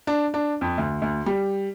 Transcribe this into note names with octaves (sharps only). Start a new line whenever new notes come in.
D4
D4
F2
D2
D2
G3